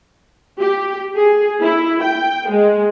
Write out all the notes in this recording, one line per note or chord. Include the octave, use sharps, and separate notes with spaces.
G4
G#4
E4
G5
G#3